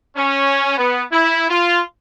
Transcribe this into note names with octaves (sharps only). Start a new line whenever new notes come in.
C#4
B3
E4
F4